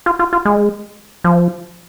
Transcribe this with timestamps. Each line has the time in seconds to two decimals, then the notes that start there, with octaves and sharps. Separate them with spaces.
0.06 F4
0.19 F4
0.33 F4
0.45 G#3
1.24 F3